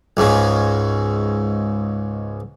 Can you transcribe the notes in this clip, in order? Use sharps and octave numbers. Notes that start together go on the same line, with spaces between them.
C#2 G#2 C#3